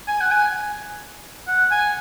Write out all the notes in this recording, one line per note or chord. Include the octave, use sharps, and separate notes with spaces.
G#5
F#5
G#5
F#5
G#5